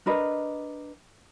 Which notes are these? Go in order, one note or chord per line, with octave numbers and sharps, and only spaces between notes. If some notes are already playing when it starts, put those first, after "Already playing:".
D4 A#4 B4 D#5